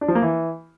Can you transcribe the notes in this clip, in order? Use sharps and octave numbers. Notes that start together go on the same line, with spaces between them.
D4
F3
A#3
E3